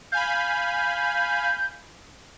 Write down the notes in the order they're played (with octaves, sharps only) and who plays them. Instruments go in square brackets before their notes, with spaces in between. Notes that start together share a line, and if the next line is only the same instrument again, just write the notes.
[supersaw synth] F5 G#5 B5 [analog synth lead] G6